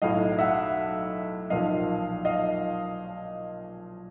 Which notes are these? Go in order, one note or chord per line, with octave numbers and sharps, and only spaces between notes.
B1 A2 F#3 D#5 F5
E5 F#5
B1 A#2 F3 D#5 F5
D#5 F5